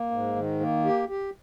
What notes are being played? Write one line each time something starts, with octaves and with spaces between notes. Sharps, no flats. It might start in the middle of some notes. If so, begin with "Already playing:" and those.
Already playing: A#3
G#2
D#3
A#3
G4
G4